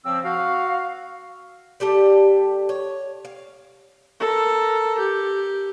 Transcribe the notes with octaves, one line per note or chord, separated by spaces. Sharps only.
C#3 F3 C4 E6
F#4 F5
G3 G4 A4 A5
C#5
F5
A4 A#4
G4